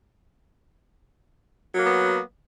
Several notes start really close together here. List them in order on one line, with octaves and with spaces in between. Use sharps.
F#3 A#3 B3